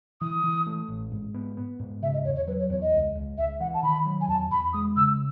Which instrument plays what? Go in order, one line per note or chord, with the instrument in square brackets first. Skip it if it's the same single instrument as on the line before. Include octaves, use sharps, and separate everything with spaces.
[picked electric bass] E3 [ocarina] D#6
[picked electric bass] E3
A3
A1
G#2
B3
B3
G#2
[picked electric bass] C#3 [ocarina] E5
[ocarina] D#5
[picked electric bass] E2 [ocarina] C#5
[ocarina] C#5
[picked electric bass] F#3 [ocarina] B4
[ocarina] C#5
[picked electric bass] E2 [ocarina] C#5
[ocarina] D#5
[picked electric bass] C#2
C#2
[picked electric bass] C#2 [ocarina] E5
[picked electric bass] E3 [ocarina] F#5
[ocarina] A5
[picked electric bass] D#3 [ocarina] B5
[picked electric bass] F#3
[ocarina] G#5
[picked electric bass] E2 [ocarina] A5
[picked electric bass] E2 [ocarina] B5
[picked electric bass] G#3 [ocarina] D#6
[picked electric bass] C#3 [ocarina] E6